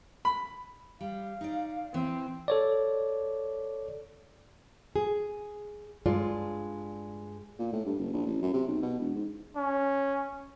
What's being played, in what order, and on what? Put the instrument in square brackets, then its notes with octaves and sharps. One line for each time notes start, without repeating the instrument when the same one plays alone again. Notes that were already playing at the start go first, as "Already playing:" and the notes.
[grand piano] B5
[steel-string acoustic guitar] G3 [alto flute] F5
[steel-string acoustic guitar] D#4 D5
[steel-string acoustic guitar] E3 [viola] C4
[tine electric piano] A4 C#5 D5
[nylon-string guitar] G#4
G2 G#3 F4 D5
[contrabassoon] A#2
A2
G2
F#1
A#1
A1
F#2
C3
B1
B2
E1
G#2
[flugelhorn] C#4